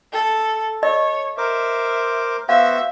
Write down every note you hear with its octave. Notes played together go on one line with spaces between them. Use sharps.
A4
C#5 D#5
A#4 C5 E5 D6
B3 F#4 C5 E5 F5